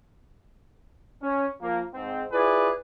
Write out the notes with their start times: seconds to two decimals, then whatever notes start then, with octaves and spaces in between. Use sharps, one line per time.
1.21 C#4
1.61 F3 A#3
1.94 G#2 C4
2.32 E4 F4 G#4 B4 D5